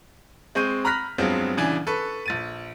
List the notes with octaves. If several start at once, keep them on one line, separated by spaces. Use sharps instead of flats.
G#3 C4 C#6 G6 D#7
A#5 B5 F6 F#6 A#6 B6
G2 F#3 G#3 B3 C4 F4
D#1 C#3 E3 D4 G#5
A4 B4 C#6
A#1 A6 D#7